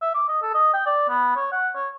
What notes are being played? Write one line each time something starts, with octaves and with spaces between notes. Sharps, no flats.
E5
D6
D#5
A4
D#5
G5
D5
B3
C#5
F#5
C#5